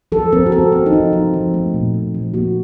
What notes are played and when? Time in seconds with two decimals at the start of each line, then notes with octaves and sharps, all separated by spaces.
0.12 F3 A4
0.33 C4 A#4
0.46 F#4
0.52 C4 A4
0.72 C4
0.86 D#4
0.93 F3 F4
1.13 C4
1.34 F3
1.54 A3
1.74 A#2
1.94 C4
2.14 F3
2.34 A#3 F#4